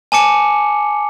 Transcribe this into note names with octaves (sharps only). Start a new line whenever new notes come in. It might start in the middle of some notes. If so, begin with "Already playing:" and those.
G#5 A5 D6 C#7